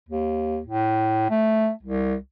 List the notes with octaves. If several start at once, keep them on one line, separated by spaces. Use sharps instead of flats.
D#2
A2
A3
C2